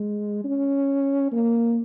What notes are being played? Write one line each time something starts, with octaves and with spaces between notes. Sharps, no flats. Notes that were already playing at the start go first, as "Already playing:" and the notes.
Already playing: G#3
C#4
A#3